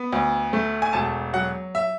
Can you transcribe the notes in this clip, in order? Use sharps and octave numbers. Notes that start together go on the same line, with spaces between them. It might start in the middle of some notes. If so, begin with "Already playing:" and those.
Already playing: B3
D2
A3
G#5
E1 A5
F#3 F#5
E5